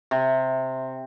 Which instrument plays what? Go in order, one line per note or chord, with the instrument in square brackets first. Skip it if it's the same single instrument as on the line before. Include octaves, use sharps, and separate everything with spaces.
[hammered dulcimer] C3